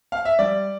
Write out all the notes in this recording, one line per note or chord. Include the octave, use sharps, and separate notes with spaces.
F5
E5
G3 D5